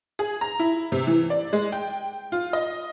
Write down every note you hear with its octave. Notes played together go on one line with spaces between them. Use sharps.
G#4
A#5
E4
C3
E3
D5
G#3
G5
F4
D#5